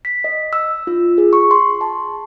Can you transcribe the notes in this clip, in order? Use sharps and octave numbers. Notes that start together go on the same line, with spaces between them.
B6
D#5
E6
F4
G#4
C#6
C6
A5